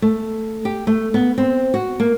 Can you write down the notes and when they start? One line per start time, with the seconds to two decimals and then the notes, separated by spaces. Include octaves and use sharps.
0.02 A3
0.65 G4
0.87 A3
1.14 B3
1.38 C4
1.74 F#4
2.00 A#3